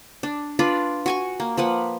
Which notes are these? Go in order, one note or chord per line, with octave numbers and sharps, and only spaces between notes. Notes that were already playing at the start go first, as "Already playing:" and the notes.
D4
D4 F4 B4 D5
F#4 G#5 C#6
A#3
F3 A#3 B4 F#5